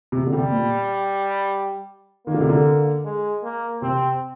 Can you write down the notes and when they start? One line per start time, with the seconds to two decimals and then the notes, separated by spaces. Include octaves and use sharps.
0.12 C3
0.27 D3
0.33 C3 G3
0.52 A#2
2.27 D#3 A#3
2.34 D3
2.41 C3
2.49 D3
3.04 G#3
3.43 A#3
3.82 C3 C4